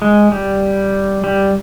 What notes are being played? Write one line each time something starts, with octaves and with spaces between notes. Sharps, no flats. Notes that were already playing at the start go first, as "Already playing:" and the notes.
G#3
G3
G3